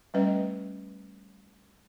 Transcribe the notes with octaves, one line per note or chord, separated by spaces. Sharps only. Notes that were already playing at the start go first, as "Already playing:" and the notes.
G3 A3 C#4 B4 D#5